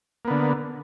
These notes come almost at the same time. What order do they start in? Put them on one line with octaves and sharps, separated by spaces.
A#3 B3 D3